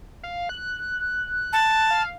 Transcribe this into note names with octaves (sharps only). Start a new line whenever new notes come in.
F5
F#6
A5
F5